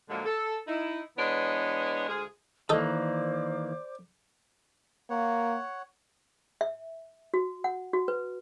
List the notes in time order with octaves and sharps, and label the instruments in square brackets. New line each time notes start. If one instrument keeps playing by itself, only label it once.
[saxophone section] A#2 D3 F3 F#3 G#3 A#3
A4
D#4 E4
E3 G#3 B3 D4 C#5 D#5
D2 G#3 F4 G#4
[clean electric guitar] D#3 E3 A#3 [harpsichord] D#4 A4 [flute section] C5 D5 D6
[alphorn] A#3 [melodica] C#5 F#5
[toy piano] E5
F#4
F#5
F#4
B4